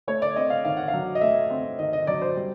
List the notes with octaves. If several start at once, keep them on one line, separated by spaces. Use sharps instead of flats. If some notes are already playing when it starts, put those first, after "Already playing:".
A3 C#5
D5
C4 D#5
F5
D#3 F5
F#5
F5
F#3
D#5
A3 E5
C4
D#3 D#5
D#5
F#3 D5
C5
G3